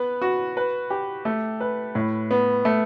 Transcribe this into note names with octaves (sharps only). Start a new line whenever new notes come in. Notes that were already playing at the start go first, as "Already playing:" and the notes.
Already playing: B3 B4
F#4
B4
G4
A3
B4
A2
B3
A3